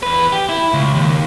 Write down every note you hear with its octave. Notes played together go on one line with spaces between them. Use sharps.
E2 B4
G4
E4
C#2
D#2